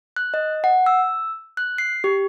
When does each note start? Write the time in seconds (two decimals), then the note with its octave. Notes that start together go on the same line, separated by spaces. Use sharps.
0.16 F#6
0.34 D#5
0.64 F#5
0.86 E6
1.57 F#6
1.78 C7
2.04 G4